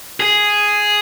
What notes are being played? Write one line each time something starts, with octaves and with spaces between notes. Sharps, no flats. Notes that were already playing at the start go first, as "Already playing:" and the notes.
G#4